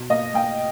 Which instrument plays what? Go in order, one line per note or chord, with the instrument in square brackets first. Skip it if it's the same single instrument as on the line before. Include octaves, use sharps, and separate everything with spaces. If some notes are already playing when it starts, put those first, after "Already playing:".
Already playing: [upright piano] B2
A#3 D#5
A#3 G5